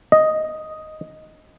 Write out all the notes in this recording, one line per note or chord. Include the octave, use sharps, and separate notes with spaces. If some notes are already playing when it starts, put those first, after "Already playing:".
D#5